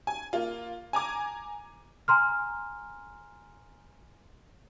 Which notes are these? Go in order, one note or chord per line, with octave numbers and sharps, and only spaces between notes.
G#5
A#3 F4
G#5 A#5 D6 G#6
G#5 A#5 C6 F6